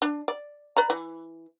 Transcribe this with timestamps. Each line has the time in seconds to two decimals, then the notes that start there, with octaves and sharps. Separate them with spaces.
0.02 D4
0.28 D5
0.77 B4 D5 A#5
0.90 E3